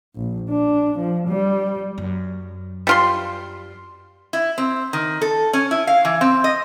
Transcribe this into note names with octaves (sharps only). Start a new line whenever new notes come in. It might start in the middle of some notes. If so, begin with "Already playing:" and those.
A#1
D4
F3
G3
F#2
G3 F4 C6
E4
C4
D#3
A4
C#4
E4
F5
E3
C4
D#5